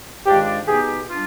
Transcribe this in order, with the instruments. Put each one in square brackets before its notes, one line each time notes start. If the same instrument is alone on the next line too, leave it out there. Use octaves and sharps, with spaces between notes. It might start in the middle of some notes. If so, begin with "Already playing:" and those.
[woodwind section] G#2 D#3 G#3 D4 F4 [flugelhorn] G4
[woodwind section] B2 B3 D#4 G4 [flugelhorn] G#4
[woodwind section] G3 D4 F4